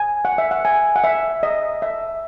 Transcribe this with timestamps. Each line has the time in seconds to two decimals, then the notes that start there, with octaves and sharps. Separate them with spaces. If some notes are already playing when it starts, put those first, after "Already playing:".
Already playing: G#5
0.25 F#5
0.38 E5
0.51 F#5
0.65 G#5
0.96 F#5
1.04 E5
1.43 D#5
1.82 E5